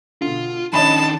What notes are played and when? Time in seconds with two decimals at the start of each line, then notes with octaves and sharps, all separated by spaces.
0.22 B2 D3 F4
0.73 D#3 C#4 D4 D#5 A5 B5